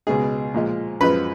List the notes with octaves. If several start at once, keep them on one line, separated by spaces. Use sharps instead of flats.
C#2 B2 G#3 G#4
A#2 F3 G#3
F#2 F3 G#3 B4